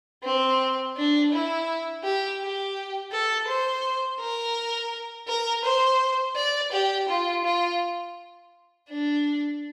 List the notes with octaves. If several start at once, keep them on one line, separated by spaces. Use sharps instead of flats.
C4
D4
E4
G4
G4
A4
C5
A#4
A#4
C5
D5
G4
F4
F4
D4